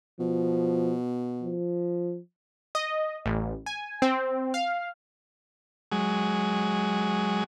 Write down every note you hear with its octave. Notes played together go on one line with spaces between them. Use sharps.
B2 F3
F3
D#5
A1
G#5
C4
F5
F#3 G#3